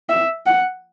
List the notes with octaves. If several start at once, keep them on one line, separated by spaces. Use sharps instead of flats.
E5
F#5